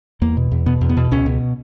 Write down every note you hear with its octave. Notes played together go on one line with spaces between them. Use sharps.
E2 A#3
B2
E2
B2 B3
E2
B3
B2
C#2 C#4
B2